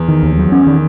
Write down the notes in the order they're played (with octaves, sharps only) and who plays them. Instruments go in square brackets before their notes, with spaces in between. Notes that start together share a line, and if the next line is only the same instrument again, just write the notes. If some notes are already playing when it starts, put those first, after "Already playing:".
Already playing: [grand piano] E2
[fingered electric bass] D#3
D#2
F#3
C#4
D#3